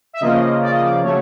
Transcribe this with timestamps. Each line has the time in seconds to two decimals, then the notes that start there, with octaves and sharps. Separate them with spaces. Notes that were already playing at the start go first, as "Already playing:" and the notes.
0.13 E5
0.20 C#3 F3 A#3 D#5
0.62 D5
0.71 D#5
0.81 D5
1.02 C#3 F#3 A3 C#5